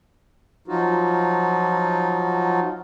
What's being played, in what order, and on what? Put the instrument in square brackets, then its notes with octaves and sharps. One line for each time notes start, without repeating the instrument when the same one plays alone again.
[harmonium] F3 F#3 D#4 F4 F#4